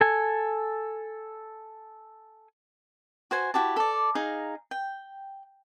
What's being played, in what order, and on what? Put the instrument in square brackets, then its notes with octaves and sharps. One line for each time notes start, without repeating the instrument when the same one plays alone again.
[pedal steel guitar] A4 G#5
[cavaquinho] F#4 C5 G#5
E4 F#4 G4 A5
A4 D5
D#4 G#4 F5 A#5
G5